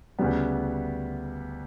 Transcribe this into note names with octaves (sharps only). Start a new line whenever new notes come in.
D2 C#3 G3 B3